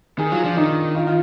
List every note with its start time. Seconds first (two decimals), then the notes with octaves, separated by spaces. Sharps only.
0.19 D#3 G#4
0.31 F#3 F4
0.44 F3 D4
0.57 D#3 D#4
0.95 F4
1.07 F4